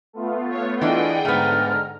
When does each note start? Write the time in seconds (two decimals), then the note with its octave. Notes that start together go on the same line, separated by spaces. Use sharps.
0.13 A3 B3 F4
0.51 C#5
0.81 E3 D4 G#4 D#5 F#5 G5
1.25 G#2 D3 A3 B3 A#5 F6